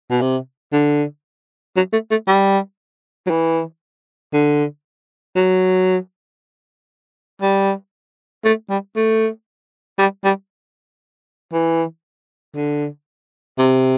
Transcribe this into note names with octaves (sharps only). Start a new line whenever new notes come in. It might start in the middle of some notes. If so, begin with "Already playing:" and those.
B2
C3
D3
F#3
A3
A3
G3
F#3
E3
D3
F#3
G3
A3
G3
A3
G3
G3
E3
D3
C3